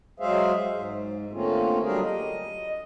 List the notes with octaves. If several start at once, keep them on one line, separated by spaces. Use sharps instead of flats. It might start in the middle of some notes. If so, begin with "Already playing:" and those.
F#3 G#3 G#4 C5 E5 F5
G#2
D3 A3 A#3 C4 C#4 F4
F#3 G3 D4 G4 G#4 A#4
D#5